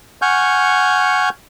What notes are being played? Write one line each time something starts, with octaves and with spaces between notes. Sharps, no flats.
F#5 G#5 C#6 F6 G6